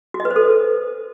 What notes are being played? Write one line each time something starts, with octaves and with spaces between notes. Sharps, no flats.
F#4
D#5
B4
C5
A4